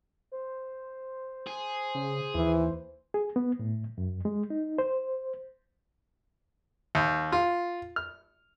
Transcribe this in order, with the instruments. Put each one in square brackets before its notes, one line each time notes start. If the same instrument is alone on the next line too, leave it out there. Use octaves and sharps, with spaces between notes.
[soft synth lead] C5
[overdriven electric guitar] G#4
[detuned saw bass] C#3
[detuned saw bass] D#2 [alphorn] E3
[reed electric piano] G#4
B3
A2
F#2
G#3
D#4
C5
[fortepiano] D#2
F4
F6